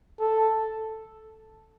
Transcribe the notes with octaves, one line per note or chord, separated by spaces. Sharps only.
A4